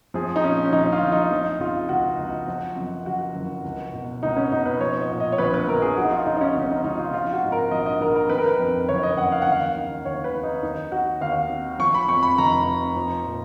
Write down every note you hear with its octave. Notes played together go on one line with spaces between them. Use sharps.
F3 G#4
D#4
A#2 C#4
C#4
A#1 D#4
F4
A#1
D#4
F3 D#4
C#3 F4
C#2 F#4
C#2
F3
F#2
F#1 F#4
F#1
C#2
B2
C#2 D#4
C#4
B2 D#4
B4
F3 C#5
D#5
A#2
D#5
C#5
A#1 B4
B4
A#1 A#4
G#4
F3 F#4
D#4
F4
C#3 D#4
D#4
C#4
C#2 C#4
D#4
C#2 D#4
F4
F3 F4
F#4
G#2
A#4
A#1 D#5
D#5
A#1 A#4
A#4
D#3 B4
A#4
B4
F2
F#1 C#5
D#5
F#1 F#5
F5
F#5
D#2 F5
D#3
D#2 C#5
B4
D#3
D#4
D#2 D#4
D#3 F#4
D#2 F5
D#3
F3 C#6
B5
F2 C#6
B5
F1 A#5
F1
F3
A#2